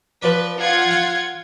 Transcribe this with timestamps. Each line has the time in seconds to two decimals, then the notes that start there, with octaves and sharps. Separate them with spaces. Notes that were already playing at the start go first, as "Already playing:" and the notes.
0.22 F3 B4 D5
0.60 F4 F#5 G#6
0.91 G5